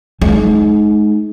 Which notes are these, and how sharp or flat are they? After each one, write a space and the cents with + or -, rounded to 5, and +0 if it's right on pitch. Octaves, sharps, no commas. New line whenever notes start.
G#3 +35 D#4 +0